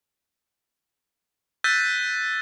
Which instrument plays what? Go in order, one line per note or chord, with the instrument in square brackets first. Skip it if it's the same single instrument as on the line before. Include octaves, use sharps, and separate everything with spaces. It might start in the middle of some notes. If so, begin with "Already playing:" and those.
[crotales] E6 F#6 G6 A6 B6 D#7